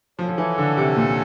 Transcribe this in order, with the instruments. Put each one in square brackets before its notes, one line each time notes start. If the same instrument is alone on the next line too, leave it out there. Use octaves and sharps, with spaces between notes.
[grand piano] F3 [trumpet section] C#4 F#4 A4 C#5
[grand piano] F3
E3
D3
C3
A#2